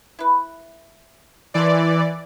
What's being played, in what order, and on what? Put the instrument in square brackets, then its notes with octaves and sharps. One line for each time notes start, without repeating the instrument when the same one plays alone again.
[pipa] E4 B4
[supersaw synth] E3 D5 [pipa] A#3 A5 C6